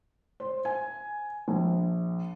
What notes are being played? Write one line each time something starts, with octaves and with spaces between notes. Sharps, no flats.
C5
G#5
A#1